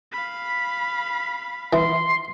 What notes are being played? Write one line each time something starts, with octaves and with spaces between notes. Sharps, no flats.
F5 B5
E3 C6